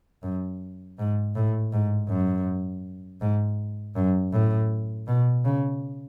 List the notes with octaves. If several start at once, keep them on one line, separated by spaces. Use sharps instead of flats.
F#2
G#2
A2
G#2
F#2
G#2
F#2
A2
B2
C#3